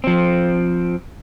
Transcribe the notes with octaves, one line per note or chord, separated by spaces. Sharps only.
F3 C4